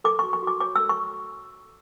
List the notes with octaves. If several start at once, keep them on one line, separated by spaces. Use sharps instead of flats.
A4 D6
F#4 C#6
C#6
F#4 D6
C#5 D6
A4 E6
C#6